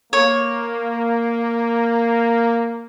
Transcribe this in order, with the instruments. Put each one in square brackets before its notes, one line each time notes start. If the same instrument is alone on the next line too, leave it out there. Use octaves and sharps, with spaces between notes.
[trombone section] A#3 [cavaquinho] C#5